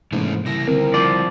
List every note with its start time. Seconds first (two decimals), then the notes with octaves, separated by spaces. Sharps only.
0.12 G#2 C3 E3 A3 A#3 C#4
0.46 C#3 E3 G3 E4 A#6
0.68 D3 D#3 C4 A#4
0.94 F3 D5